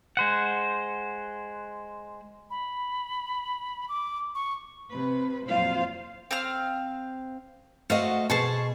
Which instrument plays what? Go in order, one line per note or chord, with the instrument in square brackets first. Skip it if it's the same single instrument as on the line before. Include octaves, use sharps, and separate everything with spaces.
[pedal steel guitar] G#3 C5 F#5
[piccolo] B5
D6
C#6
[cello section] C3 B4
F2 A#2 F#3 F4 C5 F5
[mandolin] C4 F5 F6
[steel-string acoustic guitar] A3 C5 D#5 [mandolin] F#4 F5
[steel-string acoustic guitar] B2 G#4 [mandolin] C5 A5 C#6